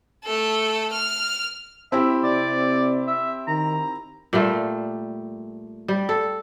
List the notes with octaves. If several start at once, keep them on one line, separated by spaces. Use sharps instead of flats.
A3 A4
F6
C4 E4 G4 E5
C3 D5
E5
D#3 A#5
A#2 G3 A3
G3
A4